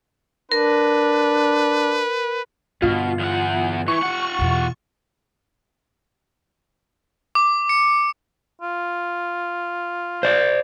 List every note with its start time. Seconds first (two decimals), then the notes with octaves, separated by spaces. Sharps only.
0.52 D4 A#4 B4
2.82 G2 B2 D3 F4
3.19 E2 F#5
3.88 E3 C#6
4.03 F4 F#5
4.39 E2 B2
7.35 D6
7.69 C#7
8.61 F4
10.23 C5 D5